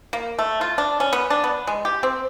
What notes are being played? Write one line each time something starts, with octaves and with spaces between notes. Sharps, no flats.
A#3
A3
F4
D4
C#4
B3
D4
B3
G#3
G4
C4